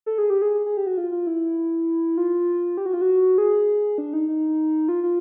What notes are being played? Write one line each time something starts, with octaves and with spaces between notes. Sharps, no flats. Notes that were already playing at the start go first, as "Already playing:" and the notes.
A4
G#4
G4
G#4
G#4
G4
F#4
F4
F4
E4
F4
G4
F#4
F4
F#4
G#4
D4
D#4
D#4
F4
F4